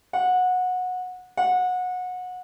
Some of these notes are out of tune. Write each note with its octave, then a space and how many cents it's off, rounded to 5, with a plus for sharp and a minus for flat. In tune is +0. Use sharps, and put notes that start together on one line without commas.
F#5 -20
F#5 -25